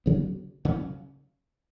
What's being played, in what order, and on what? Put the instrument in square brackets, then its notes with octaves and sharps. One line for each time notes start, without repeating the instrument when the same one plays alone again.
[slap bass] D2 C#3 F#3 B3
C#3 F#3 C#4